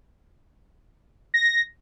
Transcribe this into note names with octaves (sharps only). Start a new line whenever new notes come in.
A#6